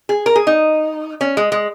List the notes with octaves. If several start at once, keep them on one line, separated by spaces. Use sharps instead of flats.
G#4
A#4
G#4
D#4
C#4
G#3
G#3